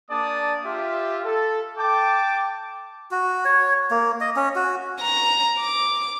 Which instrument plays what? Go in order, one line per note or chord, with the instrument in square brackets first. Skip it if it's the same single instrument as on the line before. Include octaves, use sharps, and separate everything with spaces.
[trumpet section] A#3 D4 G#4 D5 A5 D#6
F4 G4 E5
A4
G5 A5 D6
[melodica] F#4
C#5
A#3
D#5
C#4
F#4
[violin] A#5
D6